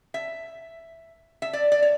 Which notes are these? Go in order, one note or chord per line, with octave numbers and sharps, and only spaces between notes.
E5
E5
D5
D5
C#5